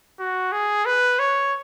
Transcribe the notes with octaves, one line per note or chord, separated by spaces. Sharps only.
F#4
G#4
B4
C#5